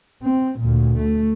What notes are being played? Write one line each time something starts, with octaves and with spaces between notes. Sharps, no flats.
C4
D2 A#2
A3